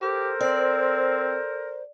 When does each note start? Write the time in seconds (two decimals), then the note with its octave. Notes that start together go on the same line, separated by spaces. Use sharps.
0.02 G4 A4 A#4 C5
0.41 C4 D5